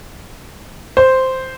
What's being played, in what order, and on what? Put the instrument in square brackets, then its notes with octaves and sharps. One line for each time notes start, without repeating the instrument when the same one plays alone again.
[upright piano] C5